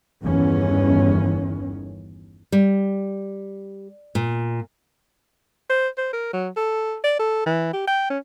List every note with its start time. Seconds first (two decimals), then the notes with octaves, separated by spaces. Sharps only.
0.22 G1 E2 G2 D#3 E3 C#4
2.52 G3
4.15 A#2
5.70 C5
5.98 C5
6.13 A#4
6.33 F#3
6.57 A4
7.04 D5
7.20 A4
7.46 E3
7.73 G4
7.88 G5
8.10 C#4